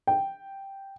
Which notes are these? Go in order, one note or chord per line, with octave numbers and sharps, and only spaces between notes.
G5